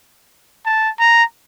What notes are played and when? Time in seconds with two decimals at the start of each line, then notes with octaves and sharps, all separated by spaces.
0.65 A5
0.99 A#5